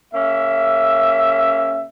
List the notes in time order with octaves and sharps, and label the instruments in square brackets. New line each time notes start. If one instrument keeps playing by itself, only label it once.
[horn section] C#3 A#3 C#4 E5